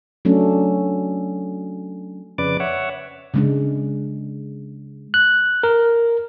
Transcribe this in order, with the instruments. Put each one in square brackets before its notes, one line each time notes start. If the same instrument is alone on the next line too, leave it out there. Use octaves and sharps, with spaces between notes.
[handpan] F#3 A3 C#4 D4 A4
[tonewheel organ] F2 C#3 B4 D5 D6
C#5 E5 F#5
[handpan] C#3 G#3 D4
[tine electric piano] F#6
A#4